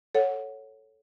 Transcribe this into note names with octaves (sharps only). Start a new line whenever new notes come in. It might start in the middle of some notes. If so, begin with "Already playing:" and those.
A4 C#5 F#5